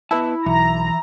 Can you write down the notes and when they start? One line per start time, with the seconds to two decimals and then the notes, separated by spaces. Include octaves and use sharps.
0.11 B3 E4 B4 A5
0.46 B1 E3 A#5